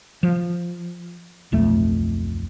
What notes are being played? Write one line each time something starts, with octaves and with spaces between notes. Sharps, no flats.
F3
D1 B1 F2 A3